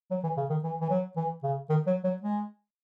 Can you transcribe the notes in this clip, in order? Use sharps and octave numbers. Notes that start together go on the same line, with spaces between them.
F#3
E3
C#3
D#3
E3
E3
F#3
E3
C#3
D#3
F#3
F#3
G#3